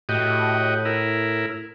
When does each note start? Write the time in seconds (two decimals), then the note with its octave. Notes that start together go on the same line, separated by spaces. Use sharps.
0.09 A2 F#4 G4 D#5
0.85 E4 A#4